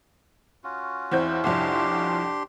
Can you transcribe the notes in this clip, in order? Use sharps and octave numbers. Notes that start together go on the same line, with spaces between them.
C#4 F4 F#4
E2 C4 E4 G6
C2 F2 D4 G4 C6